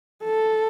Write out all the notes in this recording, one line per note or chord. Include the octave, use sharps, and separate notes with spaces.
A4